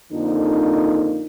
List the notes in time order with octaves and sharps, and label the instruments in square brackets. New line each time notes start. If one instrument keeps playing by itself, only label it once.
[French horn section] F2 D3 F3 A#3 D#4